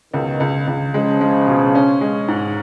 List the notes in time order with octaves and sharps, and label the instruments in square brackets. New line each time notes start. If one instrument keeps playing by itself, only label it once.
[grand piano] C#2 [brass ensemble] B2 D#3
[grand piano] C#2
C#2
[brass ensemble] C#3 F3 [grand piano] G#3
[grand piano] G#3
B2
C#4
G#3
G#2